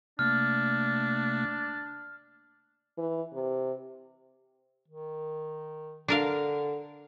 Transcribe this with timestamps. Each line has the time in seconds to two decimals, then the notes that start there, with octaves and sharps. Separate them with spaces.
0.19 C3 A3 A#3 D4 F6
2.98 E3
3.33 C3
4.88 D#3
6.08 D3 D4 A#4 F5